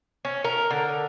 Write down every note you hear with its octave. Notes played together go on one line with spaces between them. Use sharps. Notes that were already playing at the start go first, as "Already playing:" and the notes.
C#4
A#4
D3